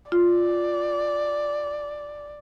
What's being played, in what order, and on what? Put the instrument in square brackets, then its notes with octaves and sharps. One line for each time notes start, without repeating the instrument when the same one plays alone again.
[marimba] F4 [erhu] D5